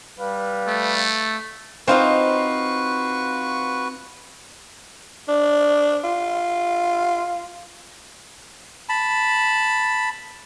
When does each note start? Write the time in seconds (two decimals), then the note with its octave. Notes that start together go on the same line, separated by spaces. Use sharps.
0.19 G3 B4 F5
0.67 A3
1.88 C4 D#4 F4 F#4 B4 C5 F5 C#6
5.28 D4
6.04 F4
8.89 A5 B5